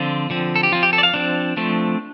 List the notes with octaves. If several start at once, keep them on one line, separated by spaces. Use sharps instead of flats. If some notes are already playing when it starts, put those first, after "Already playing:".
Already playing: D3 F3 C4 F4
D3 F3 C4
A4
G4
F3 C4 F4
G4
A4
D5
F5
F3 C4 D4
F3 A3 C4